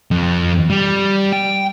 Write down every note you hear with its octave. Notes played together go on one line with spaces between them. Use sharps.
F2
G3
G5